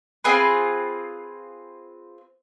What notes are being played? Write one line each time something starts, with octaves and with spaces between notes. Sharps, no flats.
C4 F4 G#4 B4